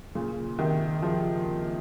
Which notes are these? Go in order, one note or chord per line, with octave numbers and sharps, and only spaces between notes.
A#2 C#3
C3 D#3
C#3 F3